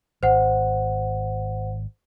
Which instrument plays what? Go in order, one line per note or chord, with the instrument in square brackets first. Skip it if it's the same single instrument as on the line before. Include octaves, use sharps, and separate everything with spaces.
[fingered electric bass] G#1 [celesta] C5 F#5